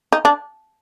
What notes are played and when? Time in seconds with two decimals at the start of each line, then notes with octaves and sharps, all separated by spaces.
0.12 D#4
0.25 D4